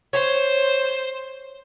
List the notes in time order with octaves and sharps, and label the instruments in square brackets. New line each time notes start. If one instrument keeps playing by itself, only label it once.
[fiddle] C5 [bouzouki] C#5